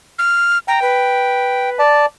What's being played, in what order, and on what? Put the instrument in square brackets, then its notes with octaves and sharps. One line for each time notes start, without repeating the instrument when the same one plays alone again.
[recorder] F6
[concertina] G5 [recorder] A#5
[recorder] B4
[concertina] D5 A5